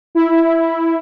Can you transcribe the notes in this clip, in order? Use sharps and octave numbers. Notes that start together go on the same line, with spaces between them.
E4